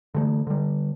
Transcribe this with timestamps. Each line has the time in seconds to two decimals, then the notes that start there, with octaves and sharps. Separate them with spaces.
0.15 D3 E3 G3 A3
0.47 D3 G3